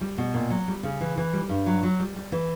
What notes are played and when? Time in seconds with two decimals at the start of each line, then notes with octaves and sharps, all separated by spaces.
0.01 G3
0.18 B2
0.34 A#2
0.50 F#3
0.68 G3
0.83 C#3
1.01 E3
1.17 E3
1.33 G3
1.49 G2
1.66 F#3
1.83 F#3
2.00 G3
2.16 G3
2.32 E3